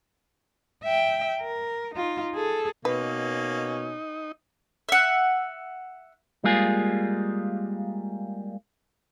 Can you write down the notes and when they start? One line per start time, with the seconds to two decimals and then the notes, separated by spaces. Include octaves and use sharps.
0.84 E5 G5
1.41 A#4
1.94 D#4 F4
2.35 G#4 A4
2.85 B2 A#3 C#4 D#4 B4
4.89 E5 F#5
6.44 G3 G#3 A#3 F4 G#4